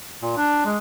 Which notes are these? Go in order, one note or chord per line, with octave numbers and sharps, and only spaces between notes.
A#2
D4
G#3